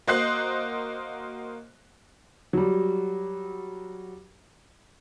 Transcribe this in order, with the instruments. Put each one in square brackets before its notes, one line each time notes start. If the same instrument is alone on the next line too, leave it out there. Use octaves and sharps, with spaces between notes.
[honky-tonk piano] A#3 F#4 C5 D#5 F#6 C7
[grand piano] F#3 G3